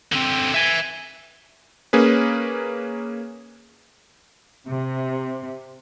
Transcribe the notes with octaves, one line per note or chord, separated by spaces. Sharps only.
D3 C4
E5 G#5
A#3 C#4 G#4 B4
C3